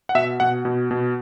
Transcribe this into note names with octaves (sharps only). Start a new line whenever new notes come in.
F#5
B2 E5
B2 F#5
B2
B2